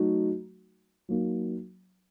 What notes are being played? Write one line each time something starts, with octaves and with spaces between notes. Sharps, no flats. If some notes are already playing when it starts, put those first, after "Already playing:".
Already playing: F#3 A3 D#4 F#4
F#3 A#3 D#4